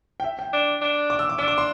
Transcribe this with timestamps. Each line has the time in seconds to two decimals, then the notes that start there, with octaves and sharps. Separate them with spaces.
0.20 G5
0.24 E5
0.39 G5
0.53 D4
0.81 D4
1.10 D6
1.19 E6
1.29 D6
1.38 D4 E6
1.48 D6
1.58 C6